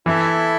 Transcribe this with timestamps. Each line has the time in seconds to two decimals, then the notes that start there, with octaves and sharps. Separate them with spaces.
0.06 E3 E4 A4 E5